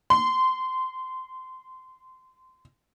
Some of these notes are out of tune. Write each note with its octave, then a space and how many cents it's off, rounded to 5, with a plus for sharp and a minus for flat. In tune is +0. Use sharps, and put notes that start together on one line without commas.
C6 -20